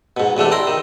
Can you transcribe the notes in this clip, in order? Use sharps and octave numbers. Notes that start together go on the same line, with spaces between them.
G#2 B2
E2 C3 A3 D4
E4 G5 A#5 C6
D#3